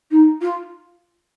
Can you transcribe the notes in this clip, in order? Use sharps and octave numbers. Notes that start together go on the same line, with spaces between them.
D#4
F4